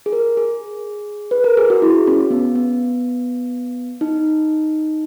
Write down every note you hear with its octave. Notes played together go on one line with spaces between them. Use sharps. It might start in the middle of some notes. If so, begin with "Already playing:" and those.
G#4
A#4
G#4
B4
A#4
G#4
F#4
E4
C#4
B3
B3
D#4